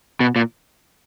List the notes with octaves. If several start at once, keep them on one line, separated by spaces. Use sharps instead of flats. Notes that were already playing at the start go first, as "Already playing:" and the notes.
B2
A#2